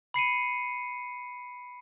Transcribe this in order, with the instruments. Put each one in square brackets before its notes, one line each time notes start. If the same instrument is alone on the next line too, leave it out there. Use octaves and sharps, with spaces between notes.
[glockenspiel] B5 C7 C#7 D#7